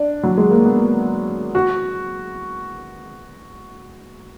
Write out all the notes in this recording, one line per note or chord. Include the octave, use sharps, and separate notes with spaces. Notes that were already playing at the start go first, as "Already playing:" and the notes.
Already playing: D4
F#3
G#3
A#3
B3
F#4